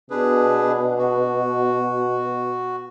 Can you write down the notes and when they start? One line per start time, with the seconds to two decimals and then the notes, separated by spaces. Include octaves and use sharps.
0.10 B2 D4 G#4 B4
0.98 F#4